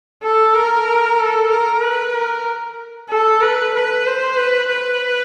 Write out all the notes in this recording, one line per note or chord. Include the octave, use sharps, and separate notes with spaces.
A4
A#4
A4
A#4
B4
A#4
A4
B4
B4
C5
B4
B4